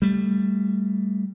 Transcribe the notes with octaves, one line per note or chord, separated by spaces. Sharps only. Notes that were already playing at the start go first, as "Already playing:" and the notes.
G3 A3